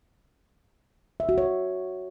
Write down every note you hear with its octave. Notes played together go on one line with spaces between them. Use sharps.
E5
F#4
C#5